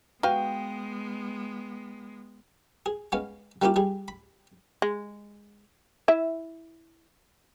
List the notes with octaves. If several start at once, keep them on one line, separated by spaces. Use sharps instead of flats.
G#3 B3 F#4 B4 F5 G5
G#4
G#3 B3 C#4 F5
G3 A#3 C#4 E4 F4 G4
G3 G#4
B5
G#3
E4 E5